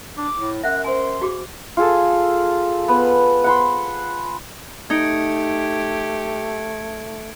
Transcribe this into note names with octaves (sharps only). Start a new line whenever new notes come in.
D4 D6
A2
F#2 E5 F#5 F#6
C5 G#5 C6
F#4 G#4 D6
F4 G#4 A4
B3
F#5 B5 C6
A3 D#4 G4 G#6 C#7 D7